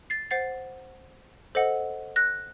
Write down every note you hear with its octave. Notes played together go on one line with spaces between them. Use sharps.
A6 C7
C5 F#5 A6 C7
A4 C5 D#5 F#5
F#6 A#6